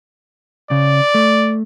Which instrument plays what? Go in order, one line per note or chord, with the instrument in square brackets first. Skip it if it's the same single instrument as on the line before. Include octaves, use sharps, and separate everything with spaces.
[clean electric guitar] C#3 [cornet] D5
[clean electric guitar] A3